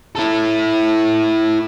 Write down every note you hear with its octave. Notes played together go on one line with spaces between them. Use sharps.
E4 A4